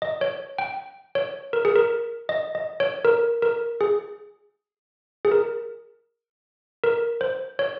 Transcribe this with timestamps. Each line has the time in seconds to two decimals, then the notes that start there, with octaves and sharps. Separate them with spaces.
0.02 D#5
0.21 C#5
0.58 G5
1.15 C#5
1.53 A#4
1.65 G#4
1.76 A#4
2.29 D#5
2.55 D#5
2.80 C#5
3.05 A#4
3.42 A#4
3.81 G#4
5.25 G#4
5.32 A#4
6.84 A#4
7.21 C5
7.59 C#5